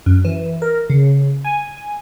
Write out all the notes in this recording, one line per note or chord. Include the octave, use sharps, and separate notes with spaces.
F#2
E3
A#4
C#3
G#5